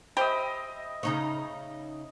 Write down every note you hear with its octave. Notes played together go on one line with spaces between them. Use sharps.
G4 C5 D#5 E5 B5
C#3 D#4 C#5